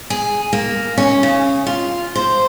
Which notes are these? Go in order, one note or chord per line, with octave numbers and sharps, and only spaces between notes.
G#4
A#3
C#4
C#3
F4
C5